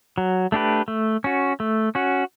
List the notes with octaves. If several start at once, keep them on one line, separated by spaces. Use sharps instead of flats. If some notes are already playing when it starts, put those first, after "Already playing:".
F#3
A3 D4 G4 B4
A3
C#4 F#4
A3
C#4 F#4